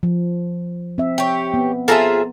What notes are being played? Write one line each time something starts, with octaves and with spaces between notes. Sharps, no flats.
F3
C4 E5
G4 C#5
B3
F4 G#4 A4 C5 E5 A#5